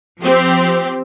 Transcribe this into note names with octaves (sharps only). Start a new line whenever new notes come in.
F3 C4 G4